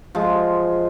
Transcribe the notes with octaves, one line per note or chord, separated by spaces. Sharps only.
F3 G#3